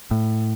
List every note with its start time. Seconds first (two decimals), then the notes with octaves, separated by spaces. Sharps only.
0.11 A2